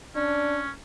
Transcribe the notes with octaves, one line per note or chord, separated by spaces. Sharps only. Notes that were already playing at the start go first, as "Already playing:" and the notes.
C#4 D4